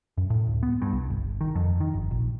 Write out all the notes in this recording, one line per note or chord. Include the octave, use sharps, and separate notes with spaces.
F#2
A2
D1
B3
G2
C2
G1
D#3
F2
D#3
G1
A#1